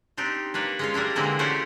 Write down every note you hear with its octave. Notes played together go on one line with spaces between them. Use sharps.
C4 D4 D#4 G4
A#3 D4 B4 C#5
G#3 C#4 F4
G3 A#3 D4 E4
D3 E3 G#3 A#3 C4 E4
A3 C#4 E4 F#4 G4 C5